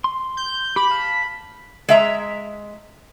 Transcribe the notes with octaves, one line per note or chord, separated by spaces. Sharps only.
C6
G6
G4 B5 D6
F5 A5 F6
G#3 E5 A#5